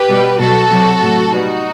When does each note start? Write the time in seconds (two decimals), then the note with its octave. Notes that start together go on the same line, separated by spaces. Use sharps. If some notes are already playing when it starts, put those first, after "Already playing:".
Already playing: G4 B4
0.09 B2 G3
0.40 B2 F#3 F#4 A4
0.70 C3 F#3
1.01 A2 F#3
1.31 B2 G3 D#4 F#4